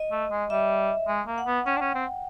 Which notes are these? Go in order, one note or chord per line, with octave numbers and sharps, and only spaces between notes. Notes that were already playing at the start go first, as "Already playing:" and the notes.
Already playing: D#5
A3
G#3
G3 E5
G#3
A#3
F#5
B3
C#4 G5
D4
C#4
C4